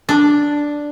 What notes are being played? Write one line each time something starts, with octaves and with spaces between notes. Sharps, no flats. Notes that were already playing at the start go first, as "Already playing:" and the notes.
D4